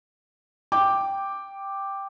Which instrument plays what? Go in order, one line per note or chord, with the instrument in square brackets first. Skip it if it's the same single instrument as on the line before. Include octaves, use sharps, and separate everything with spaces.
[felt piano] G5 D6